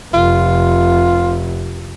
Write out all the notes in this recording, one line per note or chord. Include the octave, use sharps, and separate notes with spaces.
F1 C3 F4